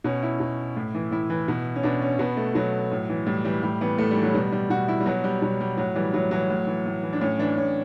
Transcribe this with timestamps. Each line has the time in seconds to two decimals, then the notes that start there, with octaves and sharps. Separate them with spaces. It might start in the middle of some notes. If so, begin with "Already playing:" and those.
0.04 B2 C#4
0.23 E4
0.40 B2
0.77 A2
0.95 E3
1.12 A2 E4
1.30 E3
1.48 B2
1.76 C#4
1.83 B2 D4
2.02 C#4
2.19 B2 B3
2.37 A3
2.55 B2 F#3
2.92 A2
3.09 E3
3.26 A2 G3
3.45 E3 G3
3.63 A2 G3
3.81 E3 B3
3.98 A2 A3
4.11 G3
4.17 E3
4.23 F#3
4.34 B2 G3
4.52 G3
4.70 B2 F#4
4.88 E4
5.00 G3
5.06 B2 F#3
5.24 G3
5.42 B2 G3
5.61 G3
5.77 A2 F#3
5.96 E3 G3
6.14 A2 F#3
6.31 E3 F#3
6.50 A2
6.67 E3
6.86 A2
7.03 E3
7.13 D4
7.21 A2 C#4
7.39 E3 D4
7.57 A2 C#4